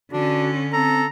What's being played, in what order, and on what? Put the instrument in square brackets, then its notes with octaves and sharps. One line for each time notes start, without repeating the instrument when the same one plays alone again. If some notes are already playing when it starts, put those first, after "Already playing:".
[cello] D3 C#4 [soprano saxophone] D4 [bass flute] F#4
[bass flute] C4 [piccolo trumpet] A4 [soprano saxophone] A#5